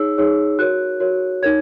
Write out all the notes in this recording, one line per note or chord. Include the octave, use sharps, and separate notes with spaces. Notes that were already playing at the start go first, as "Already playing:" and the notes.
Already playing: D#4 G#4 C#5 E6
D#4 G#4 C#5
F#4 A#4 C#5 F#6
F#4 A#4 C#5
D#4 A#4 C#5 G#6